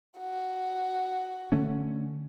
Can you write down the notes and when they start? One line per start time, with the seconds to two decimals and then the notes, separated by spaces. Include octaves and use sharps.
0.18 F#4
1.52 D3 A3 C#4